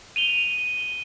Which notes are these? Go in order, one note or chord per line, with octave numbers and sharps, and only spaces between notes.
D#7 F7 G7